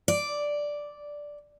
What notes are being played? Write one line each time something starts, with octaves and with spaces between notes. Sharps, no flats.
D5